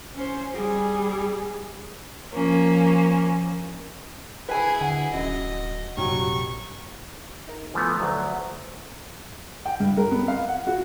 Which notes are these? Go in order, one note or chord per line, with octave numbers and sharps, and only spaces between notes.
C#4 C5
G3 G#4
F3 A#3 C#4
E4 G#4 B4 G#5
D3 F#5 G#5
D1 F#2 D#5
A#1 F#2 C3 F#3 G3 C#6
D#4 A#4
E3 F3 A3 B3
D2 F#3 B4 A#5
G5
G2
A#4
B3
F5
F#5
F#4